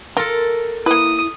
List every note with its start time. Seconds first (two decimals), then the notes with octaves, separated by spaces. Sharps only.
0.17 F4 A4 A#4
0.86 A#3 E4 B4 D#6